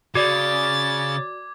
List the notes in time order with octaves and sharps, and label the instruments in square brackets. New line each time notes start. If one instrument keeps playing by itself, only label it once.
[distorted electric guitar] C#3 [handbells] F#4 D5 [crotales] D6 G#6 [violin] A6